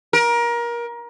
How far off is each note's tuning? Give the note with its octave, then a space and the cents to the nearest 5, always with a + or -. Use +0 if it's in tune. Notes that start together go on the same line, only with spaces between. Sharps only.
A#4 +25